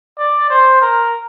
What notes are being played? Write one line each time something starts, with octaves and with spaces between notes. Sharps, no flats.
D5
C5
A#4